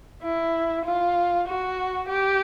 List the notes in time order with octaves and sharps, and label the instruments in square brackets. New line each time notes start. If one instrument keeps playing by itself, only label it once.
[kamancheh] E4
F4
F#4
G4